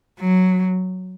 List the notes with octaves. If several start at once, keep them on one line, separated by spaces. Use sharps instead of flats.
F#3